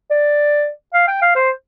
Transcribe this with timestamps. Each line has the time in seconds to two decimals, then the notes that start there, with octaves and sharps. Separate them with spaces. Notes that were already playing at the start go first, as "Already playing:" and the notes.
0.11 D5
0.94 F5
1.08 G5
1.22 F5
1.35 C5